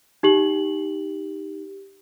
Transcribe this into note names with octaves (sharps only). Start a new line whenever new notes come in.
D#4 G4 F#7